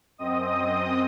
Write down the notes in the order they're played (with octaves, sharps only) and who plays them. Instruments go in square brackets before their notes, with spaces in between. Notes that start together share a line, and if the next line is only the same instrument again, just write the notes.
[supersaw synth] F#2 C4 D#5 D#6